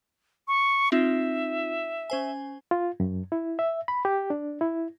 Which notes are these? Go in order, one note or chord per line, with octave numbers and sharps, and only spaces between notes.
C#6
C4 D#4 F4 E5
C#4 C5 G#5
F4
F#2
E4
E5
B5
G4
D4
E4